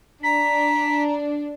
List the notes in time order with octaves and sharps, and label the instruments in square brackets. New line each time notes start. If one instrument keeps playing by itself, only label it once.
[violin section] D4 [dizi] A#5 [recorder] B6